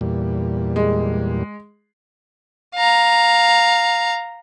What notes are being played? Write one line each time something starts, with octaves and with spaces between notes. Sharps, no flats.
E2 A#2 G3
G#3
F5 A#5